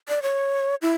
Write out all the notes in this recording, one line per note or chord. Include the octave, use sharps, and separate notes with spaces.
D5
C#5
E4